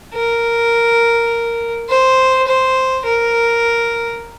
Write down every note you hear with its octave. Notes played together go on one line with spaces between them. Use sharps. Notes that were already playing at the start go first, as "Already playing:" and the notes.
A#4
C5
C5
A#4